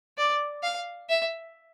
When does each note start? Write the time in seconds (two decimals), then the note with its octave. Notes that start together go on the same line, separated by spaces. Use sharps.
0.18 D5
0.63 F5
1.09 E5